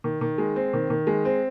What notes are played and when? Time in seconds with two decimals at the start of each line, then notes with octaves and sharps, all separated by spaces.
0.04 D#3
0.21 D#3
0.38 G#3
0.56 C4
0.73 D#3
0.90 D#3
1.07 G#3
1.25 C4